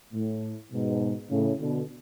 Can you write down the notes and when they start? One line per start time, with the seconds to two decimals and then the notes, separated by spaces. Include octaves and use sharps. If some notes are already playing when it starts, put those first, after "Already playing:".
0.13 A2
0.72 G#2 B2
1.31 A2 C#3
1.61 B2 D3